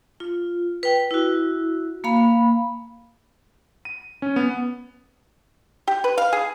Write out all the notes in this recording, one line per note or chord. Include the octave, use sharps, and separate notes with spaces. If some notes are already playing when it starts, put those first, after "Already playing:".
F4
B4 G5
E4 F#4
A#3 F5 B5
D#7
C#4
B3
G4
B4
F5
G#4